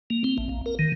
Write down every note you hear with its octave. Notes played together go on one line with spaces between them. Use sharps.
A#3
C4
A1
A#1
A#4
D#3